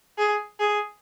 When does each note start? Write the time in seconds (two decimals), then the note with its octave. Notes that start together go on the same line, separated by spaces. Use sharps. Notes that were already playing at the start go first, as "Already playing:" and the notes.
0.18 G#4
0.60 G#4